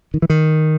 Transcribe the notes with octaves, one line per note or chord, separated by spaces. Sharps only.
D#3
E3
D#3